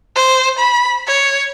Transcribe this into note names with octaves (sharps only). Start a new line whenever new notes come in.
C5
B5
C#5